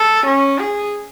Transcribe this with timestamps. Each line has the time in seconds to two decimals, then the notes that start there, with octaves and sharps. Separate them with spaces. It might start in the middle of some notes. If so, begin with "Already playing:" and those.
Already playing: A4
0.25 C#4
0.59 G#4